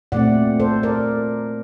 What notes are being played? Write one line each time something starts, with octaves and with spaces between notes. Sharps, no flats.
A#2 A3 C4 D5 F#5
A4 C5
A#4 D5